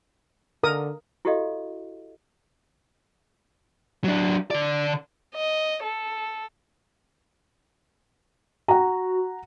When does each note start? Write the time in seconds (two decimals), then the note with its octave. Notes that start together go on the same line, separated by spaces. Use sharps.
0.63 D3 A#4 D#6
1.25 E4 F#4 G4 A4 D#5 F5
4.04 F#3 D4
4.51 D3 D5
5.35 D#5
5.83 A4
8.68 F#4 F#5 A#5